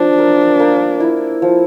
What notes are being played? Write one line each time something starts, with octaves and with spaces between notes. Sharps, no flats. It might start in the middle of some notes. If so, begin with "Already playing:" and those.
Already playing: F3 D4
A#4
A#3
E4
F3